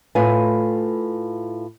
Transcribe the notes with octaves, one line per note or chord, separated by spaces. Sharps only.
A2 A3 F4 B4 G#5